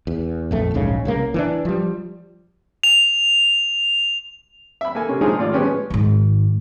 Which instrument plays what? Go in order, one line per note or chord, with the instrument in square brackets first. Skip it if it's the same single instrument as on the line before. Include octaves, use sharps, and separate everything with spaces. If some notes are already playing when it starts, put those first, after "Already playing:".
[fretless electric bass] E2
A#1 F2 A3
D1 A#1 G#2 C#3
C2 C#3 A#3
E3 C4 D4
F3 G3
[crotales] F7
[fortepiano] E5 B5
A#3 A4 G#5
C3 C#4
F3 G#3 D4 D#4 F4 G#4
G#1 A2 F4 D5
F3 G#3 B3 C#4 G4 C#5
[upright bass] G#2 D#3